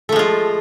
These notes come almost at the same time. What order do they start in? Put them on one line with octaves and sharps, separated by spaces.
A3 F3 G#3 F4